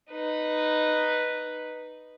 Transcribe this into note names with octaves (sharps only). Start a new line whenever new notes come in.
D#4 B4